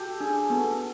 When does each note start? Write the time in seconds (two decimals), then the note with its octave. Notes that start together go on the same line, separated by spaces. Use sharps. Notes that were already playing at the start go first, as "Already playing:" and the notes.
Already playing: F#4 G4 A4
0.20 D4 G#4
0.50 B3 A4